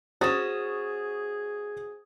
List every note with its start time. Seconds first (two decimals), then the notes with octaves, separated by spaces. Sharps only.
0.21 C#4 F#4 G#4 C5 D#6 A6 E7